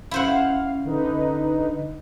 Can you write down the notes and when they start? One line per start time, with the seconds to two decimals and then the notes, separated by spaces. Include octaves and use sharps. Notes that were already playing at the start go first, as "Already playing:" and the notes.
0.11 C#4 E4 C5 F5 F#5
0.85 D3 D#4 B4